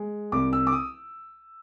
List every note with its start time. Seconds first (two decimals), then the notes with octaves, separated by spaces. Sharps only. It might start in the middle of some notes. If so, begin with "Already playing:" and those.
Already playing: G#3
0.32 C2 D6
0.53 E6
0.67 D6
0.73 D#6